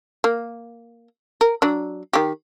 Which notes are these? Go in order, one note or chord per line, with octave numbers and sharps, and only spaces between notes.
A#3
A#4
F#3 D4
D#3 G4